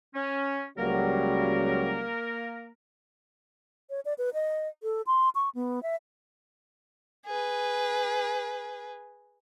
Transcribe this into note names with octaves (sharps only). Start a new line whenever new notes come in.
C#4
C#2 F#3 G3 A#3 A#4
C#5
D5
B4
D#5
A4
C6
C#6
B3
E5
G#4 B4